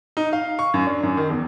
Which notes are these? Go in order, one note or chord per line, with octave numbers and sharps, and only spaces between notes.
D#4
F5
C#6
F#2
D4
F#2
D#3
E2